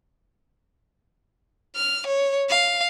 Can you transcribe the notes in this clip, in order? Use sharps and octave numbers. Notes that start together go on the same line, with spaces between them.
F6
C#5
F5